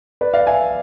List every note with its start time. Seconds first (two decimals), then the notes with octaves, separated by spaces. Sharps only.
0.21 B4 D5
0.34 D5 F5
0.46 E5 G#5